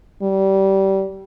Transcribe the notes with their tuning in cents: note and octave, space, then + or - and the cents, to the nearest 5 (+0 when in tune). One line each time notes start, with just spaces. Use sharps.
G3 -20